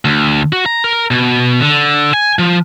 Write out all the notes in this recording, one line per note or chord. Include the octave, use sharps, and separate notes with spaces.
D2
F#4
A#5
A#4
B2
D3
G#5
F3